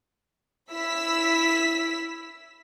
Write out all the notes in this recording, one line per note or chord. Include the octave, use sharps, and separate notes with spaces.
E4 E6 B6